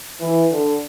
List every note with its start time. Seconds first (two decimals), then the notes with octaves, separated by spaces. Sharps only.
0.20 E3
0.51 D3